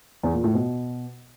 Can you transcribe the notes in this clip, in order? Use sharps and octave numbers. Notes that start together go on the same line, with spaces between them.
E2
A#2
A2
B2